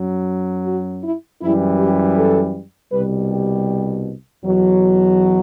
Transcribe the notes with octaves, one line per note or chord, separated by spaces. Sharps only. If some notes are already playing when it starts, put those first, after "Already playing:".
Already playing: F#2 F#3
F#4
E4
F#2 E3 G3 E4
G4
A4
C2 B2 G3 B4
G4
E2 B2 F#3